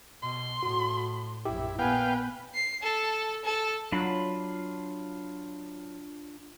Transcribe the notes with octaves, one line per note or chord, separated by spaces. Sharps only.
B2 C6
A2 F#4
A#1 F#2 E4 G4
A#2 B3 B4 F5 G5 G#5
C7
A4
A4
F#3 D4 F4 B5